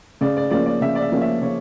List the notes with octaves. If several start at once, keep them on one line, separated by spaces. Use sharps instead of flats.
C#3 D5
D5
F3 A#3 C#4 D5
D5
C#3 E5
D5
E5
F3 A#3 C#4
E5
C#3 C#5